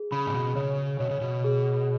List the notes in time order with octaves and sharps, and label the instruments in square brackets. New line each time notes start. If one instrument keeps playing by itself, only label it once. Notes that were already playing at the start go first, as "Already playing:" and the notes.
Already playing: [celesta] G#4
[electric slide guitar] C#3 [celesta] B5
[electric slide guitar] G#2
B2
[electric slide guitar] C#3 [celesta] C#5
[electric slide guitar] B2 [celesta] C#5
[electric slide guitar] C#3
B2
[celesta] G#4